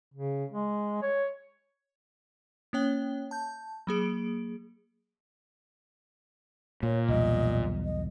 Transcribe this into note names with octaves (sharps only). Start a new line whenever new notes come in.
C#3
G#3
C#5
A#3 C#4 C#5 G5 G7
A5 G6
F#3 A#3 G#4 D7
A#2 C#5
B1 E2 G3 D#5
D#5